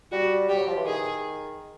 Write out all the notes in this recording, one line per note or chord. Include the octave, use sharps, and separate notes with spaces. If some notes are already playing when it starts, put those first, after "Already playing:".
G3 F#4
G3 G4
F#3
F3
E3
D#3 G#4